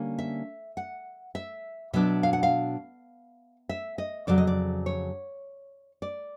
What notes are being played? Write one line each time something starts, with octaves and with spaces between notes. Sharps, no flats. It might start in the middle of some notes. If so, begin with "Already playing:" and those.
Already playing: D3 G3 A#3 C#4
E5
F#5
E5
B2 F#3 B3 D4 E5
F5
F#5
F5
E5
D#5
F2 C#3 F#3 D5
D#5
D5
C#5
D5